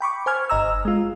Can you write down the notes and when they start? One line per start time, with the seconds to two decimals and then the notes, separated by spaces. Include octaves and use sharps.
0.01 G5 B5 C#6 D6
0.26 C5 G#5 F6 G#6
0.49 G1 D#5 A#5 E6
0.85 G#3 F4